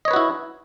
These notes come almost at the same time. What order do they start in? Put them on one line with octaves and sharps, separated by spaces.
D#5 C#5 B4 F#4 E4